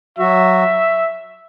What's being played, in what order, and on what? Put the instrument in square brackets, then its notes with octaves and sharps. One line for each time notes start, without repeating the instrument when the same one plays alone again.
[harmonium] F#3 F#4 [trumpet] E5